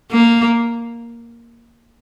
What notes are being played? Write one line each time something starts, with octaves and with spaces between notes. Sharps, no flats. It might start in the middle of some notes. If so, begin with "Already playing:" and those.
A#3